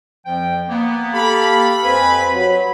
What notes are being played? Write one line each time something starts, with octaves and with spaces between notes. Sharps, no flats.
F2 F3 G5
A#3 B3
G4 A4 F5 B5
F2 C4 B4 G#5
F#3